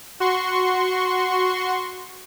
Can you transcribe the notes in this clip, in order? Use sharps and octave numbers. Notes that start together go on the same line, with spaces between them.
F#4 C6 C#6